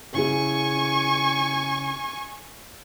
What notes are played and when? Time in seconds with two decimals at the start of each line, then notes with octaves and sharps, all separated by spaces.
0.14 C#3 E4 G#4 G#5 C#6